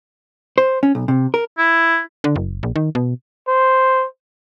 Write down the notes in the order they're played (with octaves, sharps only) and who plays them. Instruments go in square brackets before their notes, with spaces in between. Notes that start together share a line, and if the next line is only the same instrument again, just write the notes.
[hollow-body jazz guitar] C5
C#4
B1
C3
A#4
[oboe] E4
[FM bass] D3
F#1
A#1
D#3
B2
[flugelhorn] C5